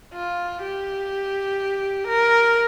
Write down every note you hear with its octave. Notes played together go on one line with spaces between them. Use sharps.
F4
G4
A#4